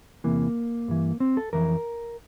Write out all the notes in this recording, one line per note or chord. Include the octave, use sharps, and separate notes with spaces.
E2 C3 E3 A#3
G2 E3
C4
A4
F2 E3 A#4